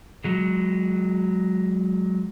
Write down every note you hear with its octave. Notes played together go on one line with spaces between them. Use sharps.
F#3 G#3